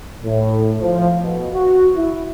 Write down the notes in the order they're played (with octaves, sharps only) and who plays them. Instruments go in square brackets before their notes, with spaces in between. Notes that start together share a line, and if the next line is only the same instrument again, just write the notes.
[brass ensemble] A2
F3
B2
F#4
E4